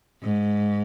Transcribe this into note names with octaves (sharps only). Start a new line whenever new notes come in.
G#2